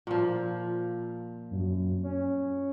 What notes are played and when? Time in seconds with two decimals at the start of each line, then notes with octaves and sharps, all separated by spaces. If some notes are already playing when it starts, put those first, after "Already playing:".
0.07 A#2 F3
1.51 F#2
2.03 C#4